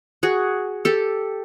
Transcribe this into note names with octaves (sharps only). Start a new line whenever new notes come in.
F#4 G#4
G4 A4